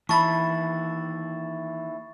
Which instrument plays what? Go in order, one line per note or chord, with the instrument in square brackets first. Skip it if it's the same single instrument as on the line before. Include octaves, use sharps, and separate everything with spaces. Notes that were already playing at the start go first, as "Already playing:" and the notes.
[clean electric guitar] D#2 E4 [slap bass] E3 [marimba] A5 B5 [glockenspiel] C#6 A6